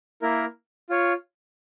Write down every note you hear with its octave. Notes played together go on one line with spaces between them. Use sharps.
A#3 E4 A#4
F4 C#5